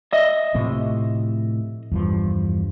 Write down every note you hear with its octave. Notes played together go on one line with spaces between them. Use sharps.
D#5 E5
A2 C3 F3
E2 G2 F3